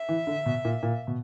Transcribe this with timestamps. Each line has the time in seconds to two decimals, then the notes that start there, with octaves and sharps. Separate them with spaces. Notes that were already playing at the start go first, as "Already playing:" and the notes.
Already playing: E5
0.09 E3
0.27 D3
0.46 B2
0.64 A#2
0.83 A#2
1.07 B2